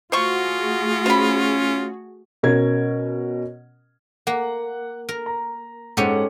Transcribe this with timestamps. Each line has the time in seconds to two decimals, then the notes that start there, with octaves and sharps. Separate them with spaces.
0.12 A3 F4 F#4 G#4 C5 C#6
1.06 C#4 C5 B5
2.43 B2 C#4 A#4 G#6
4.27 A#3 F#5
5.09 A#4
5.26 A#5
5.97 G#2 C#4 G4 A4 F#5 C#7